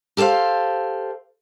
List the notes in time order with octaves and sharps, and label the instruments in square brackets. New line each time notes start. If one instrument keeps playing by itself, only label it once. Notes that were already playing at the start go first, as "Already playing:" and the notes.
[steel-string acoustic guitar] G4 A4 B4 C5 F5